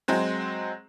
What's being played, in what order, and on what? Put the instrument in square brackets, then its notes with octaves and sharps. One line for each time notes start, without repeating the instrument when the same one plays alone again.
[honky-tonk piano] F#3 G#3 C4 G#4